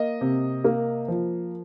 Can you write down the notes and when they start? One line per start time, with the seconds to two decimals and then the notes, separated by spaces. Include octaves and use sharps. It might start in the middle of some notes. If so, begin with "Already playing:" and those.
Already playing: A#3 D#5
0.21 C3
0.64 A#3
1.08 F3